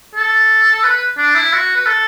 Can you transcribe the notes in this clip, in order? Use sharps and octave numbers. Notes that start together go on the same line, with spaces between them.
A4
B4
D4
E4
F#4
B4
A4